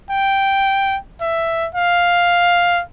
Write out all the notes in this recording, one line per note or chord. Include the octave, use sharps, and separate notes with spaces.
G5
E5
F5